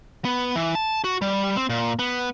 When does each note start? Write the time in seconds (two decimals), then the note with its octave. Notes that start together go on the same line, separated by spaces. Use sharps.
0.25 B3
0.55 E3
0.75 A5
1.04 F#4
1.22 G3
1.56 C4
1.70 A#2
1.99 B3